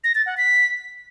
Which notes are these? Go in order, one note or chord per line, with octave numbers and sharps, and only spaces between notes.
A#6
A6
F#5
B6